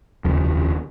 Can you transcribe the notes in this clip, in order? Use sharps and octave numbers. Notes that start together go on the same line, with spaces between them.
F1 D#2 C#3 F3